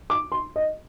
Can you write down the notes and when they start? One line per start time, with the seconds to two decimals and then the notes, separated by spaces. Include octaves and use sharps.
0.10 D6
0.32 C6
0.56 D#5